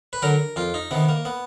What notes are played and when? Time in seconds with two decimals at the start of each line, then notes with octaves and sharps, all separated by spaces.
0.13 B4
0.22 D3 F#3 A#4
0.56 F2 F4
0.74 D#4
0.91 C3 D#3 B3
1.09 A#3
1.25 B3